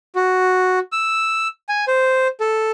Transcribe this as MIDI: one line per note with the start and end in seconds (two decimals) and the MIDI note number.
0.15 0.79 66
0.92 1.48 88
1.69 1.85 80
1.88 2.28 72
2.40 2.72 69